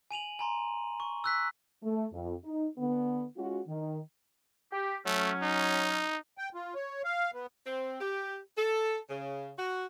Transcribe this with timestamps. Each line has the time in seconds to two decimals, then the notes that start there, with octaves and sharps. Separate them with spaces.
0.11 G#5 D#7 F7 F#7
0.39 G#5 A#5 C6
1.00 C#6
1.24 E6 F#6 B6
1.83 A3
2.13 F2
2.44 D#4
2.78 D3 B3
3.37 G#3 C#4 F4 F#4
3.68 D#3
4.73 G4
5.06 F#3 A3 C#4
5.42 D#4
6.38 G5
6.55 F4
6.75 C#5
7.04 F5
7.34 B3
7.66 C4
8.00 G4
8.57 A4
9.09 C#3
9.58 F#4